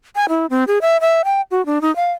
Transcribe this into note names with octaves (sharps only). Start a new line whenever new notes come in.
G#5
E4
C4
G#4
E5
E5
G5
F#4
D4
D#4
F5